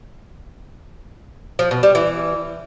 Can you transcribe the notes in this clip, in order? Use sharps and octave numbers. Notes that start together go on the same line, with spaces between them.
F3
B2
G3
E3